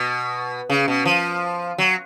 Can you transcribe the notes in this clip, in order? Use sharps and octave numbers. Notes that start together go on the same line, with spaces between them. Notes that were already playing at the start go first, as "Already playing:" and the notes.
Already playing: B2
C#3
B2
F3
F#3